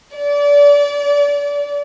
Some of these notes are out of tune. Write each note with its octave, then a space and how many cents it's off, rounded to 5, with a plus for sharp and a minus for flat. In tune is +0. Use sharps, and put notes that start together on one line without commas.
D5 -30